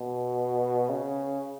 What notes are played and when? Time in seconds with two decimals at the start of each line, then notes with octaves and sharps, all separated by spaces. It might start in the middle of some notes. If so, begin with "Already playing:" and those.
Already playing: B2
0.89 C#3